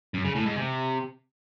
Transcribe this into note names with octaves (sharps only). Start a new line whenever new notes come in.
F#2
C#3
A2
G#2
C3